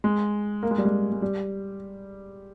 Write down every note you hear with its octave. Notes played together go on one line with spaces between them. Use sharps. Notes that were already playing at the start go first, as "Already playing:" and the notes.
G#3
A#3
G#3
G3
G#3
G#3
G3